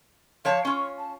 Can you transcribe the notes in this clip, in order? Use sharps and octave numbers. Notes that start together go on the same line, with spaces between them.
F3 C#5 F5 A5
C#4 F4 C#6
A5